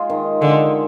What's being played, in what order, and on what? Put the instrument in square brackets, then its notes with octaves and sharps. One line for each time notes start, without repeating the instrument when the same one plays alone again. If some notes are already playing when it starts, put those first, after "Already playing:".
Already playing: [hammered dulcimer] G#3 F4
D#3
[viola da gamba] D3 [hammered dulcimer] G#3